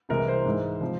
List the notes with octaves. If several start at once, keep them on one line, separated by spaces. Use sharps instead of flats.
C2 C3 E3 G#3 A#4
C5
G#2 E3 G#3
C3 F3